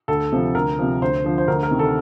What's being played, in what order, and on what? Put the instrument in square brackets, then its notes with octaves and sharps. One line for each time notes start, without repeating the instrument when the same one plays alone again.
[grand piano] D2 A4
C3 F3
D2 A#4
C3 F3
D2 C5
D3 F3
C5
D2 A#4
A#4
C3 D#3
A4